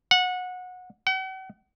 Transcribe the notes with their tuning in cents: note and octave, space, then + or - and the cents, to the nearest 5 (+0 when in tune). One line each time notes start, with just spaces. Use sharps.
F#5 -20
F#5 +45